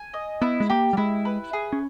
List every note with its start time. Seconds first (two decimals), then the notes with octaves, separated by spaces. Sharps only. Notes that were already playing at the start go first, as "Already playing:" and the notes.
Already playing: G#5
0.14 D#5
0.41 B3 E4
0.60 G#3
0.70 A#3 G4
0.93 G3
0.97 G#3 E4
1.25 B4
1.53 G#4
1.73 C#4